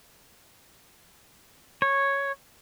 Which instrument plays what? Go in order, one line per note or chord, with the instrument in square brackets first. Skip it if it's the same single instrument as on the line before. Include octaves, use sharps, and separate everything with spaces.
[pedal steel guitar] C#5